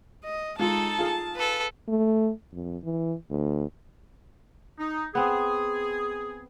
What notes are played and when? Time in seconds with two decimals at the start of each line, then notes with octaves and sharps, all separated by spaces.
0.25 D#5
0.59 G#3 D#4 F4 A4 A5
0.99 F4 G#4 F5
1.35 A4 B4
1.88 A3
2.53 F2
2.84 E3
3.31 D2
4.79 D#4
5.15 B3 C4 G#4